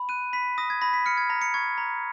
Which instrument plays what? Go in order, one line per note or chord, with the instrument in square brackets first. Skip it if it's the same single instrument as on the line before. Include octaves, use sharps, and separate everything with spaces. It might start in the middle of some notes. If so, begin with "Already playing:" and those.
Already playing: [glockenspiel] B5
F#6 D#7
B5 B6
D#6 A#6
G#6
B5 A#6
B6
F6 C#7
G#6
A#5 A#6
C#7
C#6 G#6
A#5